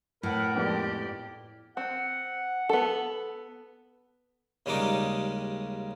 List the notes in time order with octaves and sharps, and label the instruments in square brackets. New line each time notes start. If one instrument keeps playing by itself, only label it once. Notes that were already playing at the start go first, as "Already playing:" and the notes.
[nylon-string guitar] A2 [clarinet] A#4 [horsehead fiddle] B4 F#5
[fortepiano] F2 G#3 B3 [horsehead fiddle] G4 D5
[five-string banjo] C4 [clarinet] F#5
[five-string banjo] B3 A4
[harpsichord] D#2 C#3 G3 G#3 D#4 D6